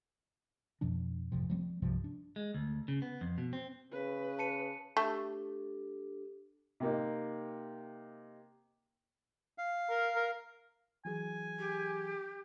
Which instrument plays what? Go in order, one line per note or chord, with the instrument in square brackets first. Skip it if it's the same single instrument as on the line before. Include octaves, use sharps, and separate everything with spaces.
[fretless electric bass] F2 B2 F3 D4
G#1 F2 C3 F3
F3 G3 A3 C4
C2 G2 C3 F3
D4
[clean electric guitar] G#3
D2
C#3
B3
F2
B2
C4
[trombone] C#3 [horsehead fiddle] B4
[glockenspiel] A5 C#7 D#7
[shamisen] A3 [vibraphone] D4 G4 A4
[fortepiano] C3 A#3 D#4
[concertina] F5
[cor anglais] A#4
A#4
[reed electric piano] E3 F#3 G#4 [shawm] G#5
[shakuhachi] G4